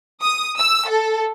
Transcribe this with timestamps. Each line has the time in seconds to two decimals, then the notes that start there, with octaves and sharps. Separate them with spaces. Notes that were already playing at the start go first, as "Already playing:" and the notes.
0.22 D#6
0.57 E6
0.88 A4